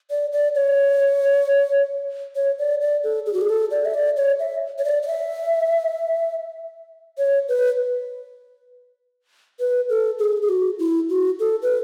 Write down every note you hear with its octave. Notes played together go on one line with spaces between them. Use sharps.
D5
D5
C#5
C#5
D5
D5
A4
G#4
F#4
G#4
A4
D5
E5
D5
C#5
E5
C#5
D5
D5
E5
C#5
B4
B4
A4
G#4
G#4
F#4
E4
F#4
A4
B4